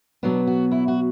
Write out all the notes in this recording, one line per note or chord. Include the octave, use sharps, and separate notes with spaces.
B2 F#3 B3 D4
F#4
E4
F#4